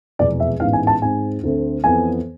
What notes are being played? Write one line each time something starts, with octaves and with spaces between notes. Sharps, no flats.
F1 E2 B2 G#3 D5
E5
A1 G#2 E3 G#3 B3 F5
G#5
A5
G#2 G#3 C4 G#5
D2 D3 A3 C4
F2 E3 B3 G#5